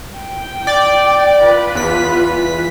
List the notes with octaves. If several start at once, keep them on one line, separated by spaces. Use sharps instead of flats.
G5
D5
F4 B4
E2 B6